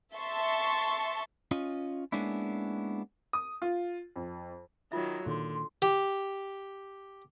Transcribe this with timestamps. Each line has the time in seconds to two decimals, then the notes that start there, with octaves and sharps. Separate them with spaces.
0.16 E5 A5 C6 C#6
1.51 C#4 F4 D#5
2.12 G#3 A#3 B3 C#4 D4 E4
3.33 D#6
3.62 F4
4.16 F2
4.92 D#3 F#3 F4 E5
5.26 A#2 D3 D#3 C6
5.82 G4